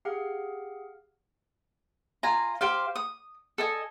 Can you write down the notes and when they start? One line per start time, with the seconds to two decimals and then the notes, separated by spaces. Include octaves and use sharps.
0.05 G4 G#4 F5 F#5 F6
2.23 F4 G#5 A#5
2.61 G4 C5 F5
2.96 D#6
3.58 A4 D#5 G#5